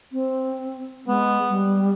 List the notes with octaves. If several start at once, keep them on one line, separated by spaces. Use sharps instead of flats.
C4
G#3 B3
G3